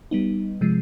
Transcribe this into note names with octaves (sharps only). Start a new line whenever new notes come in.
G3 B3 D#4
C3 F3 G#3